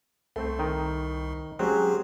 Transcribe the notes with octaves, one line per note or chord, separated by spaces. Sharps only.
C2 A3 C4 C5
D#3 D#4 G5
F#3 G#3 C4 C#4 G4 G#4 C5